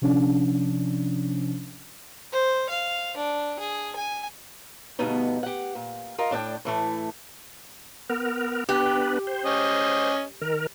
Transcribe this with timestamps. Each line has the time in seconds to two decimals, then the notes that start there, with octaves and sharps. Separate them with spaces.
0.02 C3 F3 C#4 D4
2.33 C5
2.69 F5
3.17 D4
3.59 G#4
3.96 G#5
4.99 D2 G2 B2 B3 D#4
5.43 G4 F#5
5.75 A#2
6.18 F4 A#4 D#5
6.31 A2 D4 D#5 G5
6.65 A2 E3 A3
8.10 B3 A#4
8.69 B3 D4 G4 B4
9.27 C5
9.45 C#4 D#5
10.41 D#3 A#4